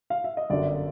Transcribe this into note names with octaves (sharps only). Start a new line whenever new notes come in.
F5
E5
D#5
G1 F#2 D3 D5